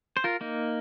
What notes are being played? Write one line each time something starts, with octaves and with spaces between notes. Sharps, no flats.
C5
F4 A#4
A#3 D#4